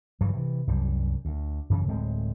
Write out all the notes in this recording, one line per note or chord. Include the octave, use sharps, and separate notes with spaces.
G2 C#3 E3 F#3
C3 E3
C2 F#2 G3
D2
F#2 C#3 E3
D1 A2 G#3 C4